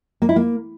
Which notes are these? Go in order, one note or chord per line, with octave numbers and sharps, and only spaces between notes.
A#3
E4
A#3